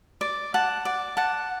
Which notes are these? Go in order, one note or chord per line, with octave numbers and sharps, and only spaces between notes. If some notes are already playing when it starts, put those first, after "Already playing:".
D5
F#5 A5
D5
F#5 A5